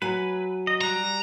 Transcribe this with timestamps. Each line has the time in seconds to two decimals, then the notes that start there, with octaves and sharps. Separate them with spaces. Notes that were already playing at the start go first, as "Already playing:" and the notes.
0.02 F#3 B4 G#5
0.67 D#5
0.81 G3 A#5 F#6